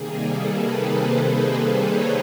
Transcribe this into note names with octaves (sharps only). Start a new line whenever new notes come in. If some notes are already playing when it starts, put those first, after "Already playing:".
Already playing: C3 D#3 G3 A#3 G#4
A4
B4
C5
C5
C#5